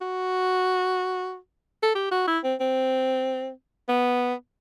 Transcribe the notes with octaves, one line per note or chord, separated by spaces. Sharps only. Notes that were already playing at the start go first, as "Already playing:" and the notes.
F#4
A4
G4
F#4
E4
C4
C4
B3